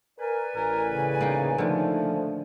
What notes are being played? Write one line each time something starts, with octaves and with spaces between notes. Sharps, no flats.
A#4 B4 D5 G#5
A1 A2 A#4
C#3
A#3 D#4 G5
D3 D#3 F3 A3